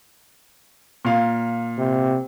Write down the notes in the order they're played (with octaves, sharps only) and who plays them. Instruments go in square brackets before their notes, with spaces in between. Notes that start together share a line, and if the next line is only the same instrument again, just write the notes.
[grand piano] A#2 F5
[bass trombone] C3